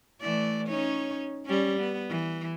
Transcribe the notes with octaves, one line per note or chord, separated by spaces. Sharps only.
E3 A3 D5
C#4 D#4 C#5
G3 C#4
B3
E3